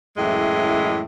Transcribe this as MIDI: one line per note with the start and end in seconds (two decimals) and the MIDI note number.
0.17 1.03 42
0.17 1.03 45
0.17 1.03 52
0.17 1.03 56